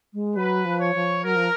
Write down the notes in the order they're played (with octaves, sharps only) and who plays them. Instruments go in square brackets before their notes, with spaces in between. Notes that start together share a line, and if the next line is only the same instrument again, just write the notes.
[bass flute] G#3
[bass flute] F#3 [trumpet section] B4
[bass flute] F3
[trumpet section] C#5
[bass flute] F3
[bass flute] F#3 [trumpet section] A#4
[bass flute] F3